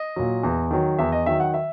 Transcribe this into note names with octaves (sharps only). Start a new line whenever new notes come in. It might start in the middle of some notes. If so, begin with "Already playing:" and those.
Already playing: D#5
A#2 F#3
E2
D#3 F#3
E2 E5
D#5
D#3 F#3 E5
F#5
E5